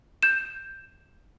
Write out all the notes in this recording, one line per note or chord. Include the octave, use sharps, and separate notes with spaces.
G6 E7